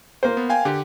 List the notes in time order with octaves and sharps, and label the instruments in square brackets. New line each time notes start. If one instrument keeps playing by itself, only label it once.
[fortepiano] A#3 C5
[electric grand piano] B3
F5 G5 G#5
D3 G4